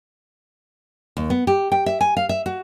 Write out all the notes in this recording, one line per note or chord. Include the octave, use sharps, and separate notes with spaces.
D#2
B3
G4
G5
E5
G#5
F5
E5
F#4